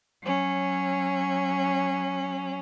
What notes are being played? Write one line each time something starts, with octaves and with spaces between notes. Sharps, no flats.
F#3 C#4